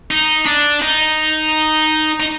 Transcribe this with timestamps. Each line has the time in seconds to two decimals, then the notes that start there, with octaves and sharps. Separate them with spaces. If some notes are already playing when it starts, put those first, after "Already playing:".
0.11 D#4
0.46 D4
0.82 D#4
2.20 D#4